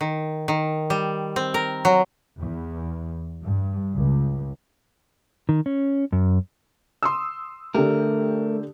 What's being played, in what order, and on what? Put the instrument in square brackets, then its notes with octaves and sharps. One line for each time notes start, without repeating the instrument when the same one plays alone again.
[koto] D#3
D#3
G3
C4
A#4
F#3
[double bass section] E2
G2
C#2
[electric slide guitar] D#3
C#4
F#2
[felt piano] C6 D#6 E6
[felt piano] D3 G4 [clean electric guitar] A3 A#4